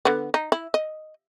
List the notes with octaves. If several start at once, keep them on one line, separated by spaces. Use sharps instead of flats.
D3 B3
D#4
E4
D#5